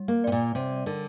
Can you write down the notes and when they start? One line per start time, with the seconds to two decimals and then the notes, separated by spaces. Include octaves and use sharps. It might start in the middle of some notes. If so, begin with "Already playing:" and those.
Already playing: G3
0.08 A#3
0.24 C3 D5
0.32 A#2
0.55 C3 G3
0.86 D3 A#4